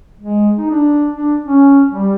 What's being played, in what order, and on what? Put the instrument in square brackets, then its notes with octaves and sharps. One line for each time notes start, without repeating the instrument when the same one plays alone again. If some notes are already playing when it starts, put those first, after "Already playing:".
[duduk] G#3
D#4
D4
D4
C#4
G3